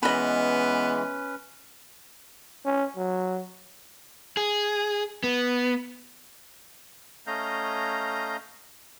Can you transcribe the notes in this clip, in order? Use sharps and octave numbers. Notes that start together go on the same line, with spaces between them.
E3 G#3 B3 C#4 B4 D#5 B5
C#4
F#3
G#4
B3
A3 C#4 D#5 F5 A#5 G6